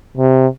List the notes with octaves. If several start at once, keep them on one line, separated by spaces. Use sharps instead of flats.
C3